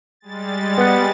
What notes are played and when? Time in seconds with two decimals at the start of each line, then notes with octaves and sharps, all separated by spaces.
0.20 G3 G#3 A6
0.78 B3 F#5